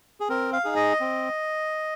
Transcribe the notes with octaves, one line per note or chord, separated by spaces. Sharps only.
G#4
C4 A#4
F5
D#4 G#4
D#5
C4